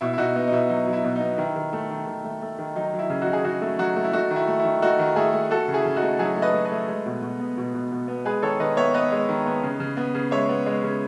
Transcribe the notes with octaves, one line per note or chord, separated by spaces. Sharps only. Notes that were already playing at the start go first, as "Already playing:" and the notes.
B2 E4
E4
B2 D#4 F#4
B3 D#4
D#4
B2 E4
F#3 D#4
F#3
E4
B2
D#4
B3
D#3 E4
D#3
A3
D#3
D#3
A3
A3
D#3
F#3 D#4
F#3
E4
C#3
D#4 F#4
C#3
G#4
C#3 D#4 F#4
A3
F#3 D#4 F#4
A3
E4
A3 D#4 F#4
D#3
E4
A3
E4
D#3
A3 D#4 F#4
D#3
A3 E4 G#4
A3
A3 F#4 A4
C#3
E4 G#4
C#3
D#4 F#4
A3
F#3 E4 G#4
A3
B4 D#5
A3
B4 D#5
A3
G#3
B2
B2
B3
B2
B2
B2
B3
G#3 G#4 B4
D#3 A4 C#5
D#3 B4 D#5
B3 C#5 E5
B3 B4 D#5
G#3
D#3
B3
C#3
C#3
B3
C#3
G#3 C#5 E5
B3
G#3
C#3